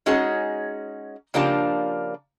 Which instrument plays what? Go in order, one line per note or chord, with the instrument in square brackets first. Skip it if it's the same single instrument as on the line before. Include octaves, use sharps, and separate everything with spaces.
[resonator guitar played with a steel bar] G#3 C#4 D#4 F#4 G#4
C#3 F3 A#3 D4 F4 G4